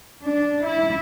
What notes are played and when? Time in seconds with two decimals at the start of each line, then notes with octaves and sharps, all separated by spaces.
0.24 D4
0.65 E4